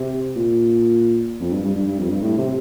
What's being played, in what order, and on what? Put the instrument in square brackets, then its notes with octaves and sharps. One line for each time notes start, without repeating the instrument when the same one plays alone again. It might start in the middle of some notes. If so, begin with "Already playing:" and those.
Already playing: [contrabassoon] C3
A#2
F2
G2
G2
G2
G2
F2
G2
A2
C3